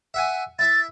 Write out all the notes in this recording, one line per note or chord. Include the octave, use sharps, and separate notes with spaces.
E5 F#5 G#5
E4 E5 A6